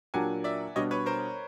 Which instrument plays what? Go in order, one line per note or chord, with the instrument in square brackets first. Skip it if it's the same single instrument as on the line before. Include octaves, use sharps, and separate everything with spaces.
[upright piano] A#2 F#3 A#3 D4 G4 [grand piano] F#5 G#5
[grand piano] D5 E5
[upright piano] B2 G3 B3 D4 [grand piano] C#5 D#5
[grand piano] B4 C#5
A#4 C5